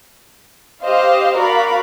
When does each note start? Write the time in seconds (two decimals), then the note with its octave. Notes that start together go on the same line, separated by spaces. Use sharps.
0.83 G4 C5 D#5 F5
1.37 F#4 A#4 D5 F5 B5